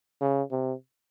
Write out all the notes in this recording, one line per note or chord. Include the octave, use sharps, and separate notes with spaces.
C#3
C3